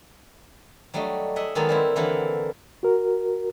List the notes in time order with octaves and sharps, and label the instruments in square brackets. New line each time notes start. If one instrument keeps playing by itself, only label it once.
[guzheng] F#3 G3 A3 D4 D#5
G#4 D#5 E5 F#5
D#3 F#3 G#3 A#3 B3 A4
G3 C4 E4
D3 E3 A#3 F#5
[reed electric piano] F#4 A#4